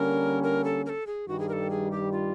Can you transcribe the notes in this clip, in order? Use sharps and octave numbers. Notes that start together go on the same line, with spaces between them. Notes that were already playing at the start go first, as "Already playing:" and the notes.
Already playing: D3 G3 A#3 C#4 A#4
A#4
A4
A#4
A4
G#4
G2 D#3 G3 F#4
G#4
A#4
A4
G#4
G4
F4